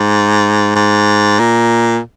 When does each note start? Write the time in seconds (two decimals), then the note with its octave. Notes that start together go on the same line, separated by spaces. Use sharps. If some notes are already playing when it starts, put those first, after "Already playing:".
Already playing: G#2
0.76 G#2
1.39 A#2